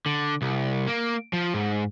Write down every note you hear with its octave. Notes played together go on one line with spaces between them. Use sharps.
D3
C2
A#3
F3
G#2